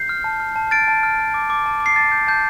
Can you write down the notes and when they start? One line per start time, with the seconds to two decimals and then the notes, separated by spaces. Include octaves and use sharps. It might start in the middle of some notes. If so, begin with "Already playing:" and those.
Already playing: G6 C7
0.09 F6
0.24 A5
0.40 F6
0.56 A5
0.71 F6 A6 D7
0.88 A5
1.03 F6
1.19 F6
1.34 D6
1.50 D6
1.66 A5
1.80 D6
1.86 C7
1.96 A5 A6
2.12 G6
2.28 A5 G6